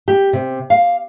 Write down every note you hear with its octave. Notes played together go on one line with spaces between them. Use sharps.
G4
C3
F5